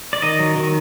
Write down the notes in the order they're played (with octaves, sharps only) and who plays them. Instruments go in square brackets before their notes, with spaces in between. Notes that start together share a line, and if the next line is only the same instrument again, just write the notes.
[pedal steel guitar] D5
D#3 D#5
F#3
D#3